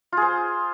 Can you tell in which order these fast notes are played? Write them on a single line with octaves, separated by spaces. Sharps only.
F4 G#4 C5